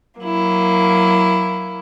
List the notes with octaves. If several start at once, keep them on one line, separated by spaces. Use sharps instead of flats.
F#3 A#3 E4